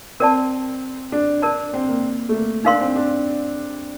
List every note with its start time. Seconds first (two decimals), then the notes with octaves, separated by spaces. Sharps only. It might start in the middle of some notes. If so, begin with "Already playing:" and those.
0.20 C4 A#4 D5 A5
1.12 D4
1.42 D4 A#4 D5 A5
1.73 C4
1.88 A#3
2.29 A3
2.34 A#3
2.65 D4 D#4 A#4 F5 C6
2.81 C4
2.96 D4